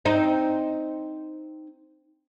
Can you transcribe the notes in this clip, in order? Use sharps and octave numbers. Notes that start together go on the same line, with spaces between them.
C4 D#4